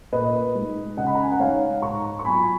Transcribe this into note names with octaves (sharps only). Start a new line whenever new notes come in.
A#2 B4 D#5
G#3 D#4
C#3 D#5 F#5
B5
A#5
G#5
F#5
G#3 D#4 C#5 F5
G#2 A#5 C#6
C#6
F#3 B3 F4 G#5 B5